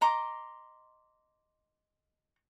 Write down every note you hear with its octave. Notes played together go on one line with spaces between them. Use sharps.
D#5 A#5 C6 D6